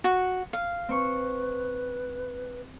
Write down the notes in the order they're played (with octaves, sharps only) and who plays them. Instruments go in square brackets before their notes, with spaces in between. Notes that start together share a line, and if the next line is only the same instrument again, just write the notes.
[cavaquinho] F#4
F5
[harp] C4 C#6 [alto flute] B4